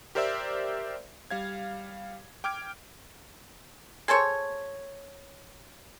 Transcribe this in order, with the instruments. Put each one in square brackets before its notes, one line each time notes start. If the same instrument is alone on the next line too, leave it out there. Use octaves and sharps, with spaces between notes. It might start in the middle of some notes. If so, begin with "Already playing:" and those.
[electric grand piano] G4 A#4 C5 D5 E5 E6
G3 F5 G#6
G5 D6 F6 G#6 D7
[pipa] G#4 A4 C5 C#5